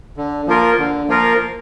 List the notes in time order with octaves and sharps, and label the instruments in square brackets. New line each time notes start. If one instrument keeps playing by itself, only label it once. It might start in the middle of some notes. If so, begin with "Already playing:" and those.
[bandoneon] D3
F3 A#3 F4 A#4
D3
F3 A#3 F4 A#4